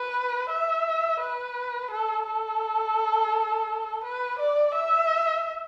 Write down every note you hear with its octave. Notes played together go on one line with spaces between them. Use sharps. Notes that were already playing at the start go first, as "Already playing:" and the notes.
Already playing: B4
E5
B4
A4
A4
B4
D5
E5